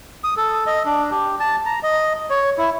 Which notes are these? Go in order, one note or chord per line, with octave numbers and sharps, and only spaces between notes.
D#6
A4
D#5
D4
G4
A5
A#5
D#5
C#5
E4